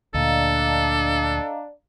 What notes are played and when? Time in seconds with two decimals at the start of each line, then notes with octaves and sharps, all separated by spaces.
0.14 D2 A#2 D4 A4 D#5 F5 A#5